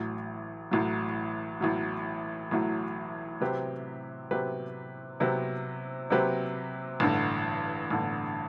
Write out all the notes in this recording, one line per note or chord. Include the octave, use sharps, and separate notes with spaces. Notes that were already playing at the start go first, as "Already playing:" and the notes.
Already playing: A1 A2 F#3
A1 A2 F#3
A1 A2 F#3
A1 A2 F#3
C3 F#3 C4 G4 B4
C3 F#3 C4 G4 B4
C3 F#3 C4 G4 B4
C3 F#3 C4 G4 B4
A1 G2 D3
A1 G2 D3